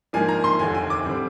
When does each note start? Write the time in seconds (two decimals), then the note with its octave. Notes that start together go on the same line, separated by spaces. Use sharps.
0.13 G#2 F3 A#3 D4 G#5
0.28 A#5
0.44 C6
0.59 F1 D#2 D3 G#5
0.74 G#5
0.90 D6
1.05 D3 G3 C4